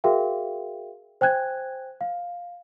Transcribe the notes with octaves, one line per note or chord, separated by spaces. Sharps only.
F#4 G#4 A#4 E5 F5 G5
C5 G5 G#5 F#6 G#6
F5